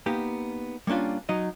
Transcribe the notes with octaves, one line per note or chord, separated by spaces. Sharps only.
A#3 B3 D#4 G4 G5
G3 A#3 C#4 D4 F4
F#3 D#4 D#5